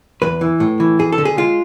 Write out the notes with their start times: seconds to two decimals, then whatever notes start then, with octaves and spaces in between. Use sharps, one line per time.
0.22 E2 B4
0.41 E3
0.60 A2
0.80 E3
0.99 F2 G#4
1.12 A4
1.18 D3
1.25 G#4
1.37 G#3 F4